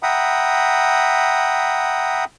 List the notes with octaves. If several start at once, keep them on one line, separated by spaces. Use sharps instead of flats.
E5 F#5 G5 A#5 B5 D#6